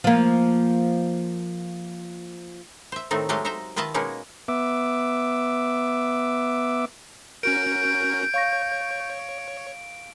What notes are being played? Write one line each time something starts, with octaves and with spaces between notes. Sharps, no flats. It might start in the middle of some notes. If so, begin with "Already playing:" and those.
F3 A#3
C5 E5
A2 D#3 A3 C4 D#4
F#3 G#3 A3 G4 D#5 F5
D#4 C5 E5 A#5
D#3 F4 B4 D#5 E5 A5
B2 G#3 A#3 C#4 D#4 G#4
B3 E5 D6
C#4 F#4 A#4 G6 D7
C#5 F5 C#6 A#6